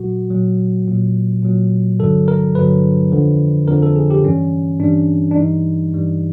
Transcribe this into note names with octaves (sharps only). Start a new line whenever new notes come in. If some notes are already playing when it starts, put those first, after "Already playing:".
Already playing: A#2 F#3 F#4
A#2 F#3
A#2 F#3
A#2 F#3
G2 D3 F#3 A4
A#4
G2 D3 F#3 B4
F2 D3 F3
F2 D3 F3 A#4
A4
G#4
G4
G2 E3 G3 C#4
G2 E3 G3 D4
D4
G2 E3 G3 D#4
G2 E3 G3